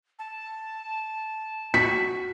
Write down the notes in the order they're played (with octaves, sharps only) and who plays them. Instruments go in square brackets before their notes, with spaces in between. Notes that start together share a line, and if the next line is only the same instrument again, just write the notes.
[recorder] A5
[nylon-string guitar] F#4 [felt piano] B6